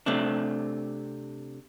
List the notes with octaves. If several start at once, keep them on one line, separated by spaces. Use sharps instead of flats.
C3 A3 C4 D4